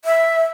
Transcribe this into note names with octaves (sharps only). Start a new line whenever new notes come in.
E5